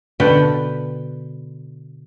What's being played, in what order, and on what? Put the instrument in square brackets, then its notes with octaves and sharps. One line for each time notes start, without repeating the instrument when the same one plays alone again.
[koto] B2 D3 B4 F#5 G5 A5